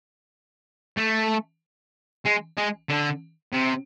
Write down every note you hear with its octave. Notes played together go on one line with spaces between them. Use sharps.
A3
G#3
G#3
D3
C3